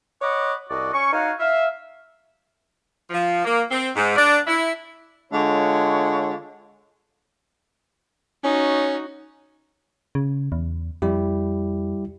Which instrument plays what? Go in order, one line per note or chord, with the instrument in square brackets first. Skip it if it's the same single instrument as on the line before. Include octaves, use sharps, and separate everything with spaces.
[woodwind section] C#5 D#5 F#5 B5 D6
C2 F#4 D5 D#5
C#4 C#6
D#4 F#4 C#5 F5
E5 F5
[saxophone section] F3
A#3
C4
G#2
D4
E4
[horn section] D3 G#3 F4 C#5
[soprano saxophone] C#4 [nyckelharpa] D#4 F#4
[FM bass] C#3
E2
[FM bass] F2 [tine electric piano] G3 E4 G4